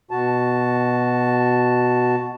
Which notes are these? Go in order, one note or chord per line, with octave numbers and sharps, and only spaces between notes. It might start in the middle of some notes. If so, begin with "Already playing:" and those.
B2 F#4 A5